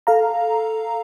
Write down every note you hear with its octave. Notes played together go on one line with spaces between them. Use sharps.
A4 F5 A#5